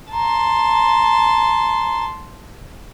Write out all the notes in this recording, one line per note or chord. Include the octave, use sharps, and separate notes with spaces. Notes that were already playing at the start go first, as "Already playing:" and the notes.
A5 A#5 C6